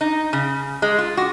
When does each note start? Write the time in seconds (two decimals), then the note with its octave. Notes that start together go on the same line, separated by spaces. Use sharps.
0.01 D#4
0.33 C#3
0.82 G#3
0.98 F4
1.17 F#4